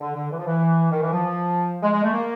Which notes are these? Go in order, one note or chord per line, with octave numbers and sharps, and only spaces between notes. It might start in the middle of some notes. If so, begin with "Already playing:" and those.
D3
D3
E3
F3
E3
D#3
E3
F3
G#3
G#3
A3
A#3